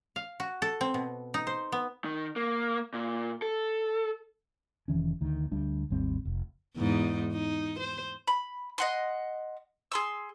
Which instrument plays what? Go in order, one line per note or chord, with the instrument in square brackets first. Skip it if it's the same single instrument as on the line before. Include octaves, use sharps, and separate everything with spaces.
[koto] F5
F#4
A4
C4
B2
D#4
C5
B3
[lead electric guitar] D#3
A#3
A#2
A4
[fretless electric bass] F1 D#3 E3 C#4
D2 D#3
D2 G3 D4
G#1 D#2 G3 C4
F1
[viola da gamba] E2 G#2 D#4
D#4
C5
[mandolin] B5
D#5 F#5 C6
G#4 C6 E6